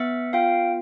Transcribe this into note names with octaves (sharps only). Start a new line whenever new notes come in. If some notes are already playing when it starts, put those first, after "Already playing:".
Already playing: B3 E5 F#5
F4 F5 G5